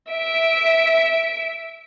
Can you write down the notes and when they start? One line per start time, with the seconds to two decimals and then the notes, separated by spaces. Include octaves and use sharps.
0.10 E5 D7